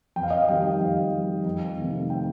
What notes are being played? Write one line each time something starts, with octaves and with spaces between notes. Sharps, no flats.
F2 G5
F5
D#5
F5
D#3 G3 G5
G5
F2 F5
D#3 G3
F2
C3 D#3 A3 C4
G5